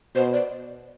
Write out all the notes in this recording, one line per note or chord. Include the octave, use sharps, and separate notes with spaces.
B2 C5
D5